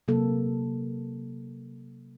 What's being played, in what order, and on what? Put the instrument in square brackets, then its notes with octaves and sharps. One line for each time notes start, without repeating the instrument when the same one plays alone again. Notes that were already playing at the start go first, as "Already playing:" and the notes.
[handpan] C3 F#3 A#3 A4